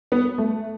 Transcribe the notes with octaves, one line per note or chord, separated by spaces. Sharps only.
B3
A3